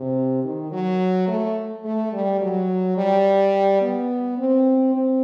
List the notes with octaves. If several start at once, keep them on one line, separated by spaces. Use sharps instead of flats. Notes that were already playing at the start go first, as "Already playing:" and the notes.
Already playing: C3
D#3
F#3
A3
A3
G3
F#3
G3
B3
C4
C4